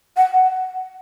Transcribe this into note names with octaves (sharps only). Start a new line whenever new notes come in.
F#5